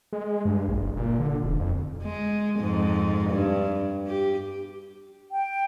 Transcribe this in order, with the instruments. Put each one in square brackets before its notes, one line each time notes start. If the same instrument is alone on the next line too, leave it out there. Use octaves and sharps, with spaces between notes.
[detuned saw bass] G#3
G2
A#1
F#1
A#2
D3
E1
F2
[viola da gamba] G#3
F2 G#2
G2
G4
[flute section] G5